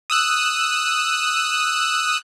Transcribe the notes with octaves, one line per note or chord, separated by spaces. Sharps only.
D#6 E6 F#6